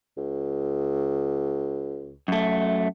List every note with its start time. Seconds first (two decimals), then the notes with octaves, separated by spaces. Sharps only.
0.17 C#2
2.28 F#2 A3